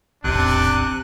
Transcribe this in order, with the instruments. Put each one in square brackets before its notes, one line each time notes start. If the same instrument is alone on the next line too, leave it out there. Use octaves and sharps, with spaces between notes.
[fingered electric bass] D#1 A1 E2 [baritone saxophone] C3 [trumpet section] D4 [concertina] F#6